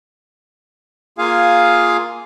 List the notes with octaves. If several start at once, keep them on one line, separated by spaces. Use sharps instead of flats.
A#3 F4 G#4 F5 G#5